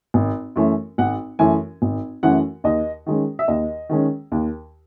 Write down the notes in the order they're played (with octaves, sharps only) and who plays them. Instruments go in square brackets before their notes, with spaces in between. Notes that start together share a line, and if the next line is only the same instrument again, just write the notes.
[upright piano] G#1
F#2 E3 A3 C#4
G#1 F#5
F#2 E3 A3 C#4 G#5
G#1
F#2 E3 A3 C#4 F#5
D#2 D#5
D#3 G#3 C#4
E5
D#2 D#5
D#3 G#3 C#4
D#2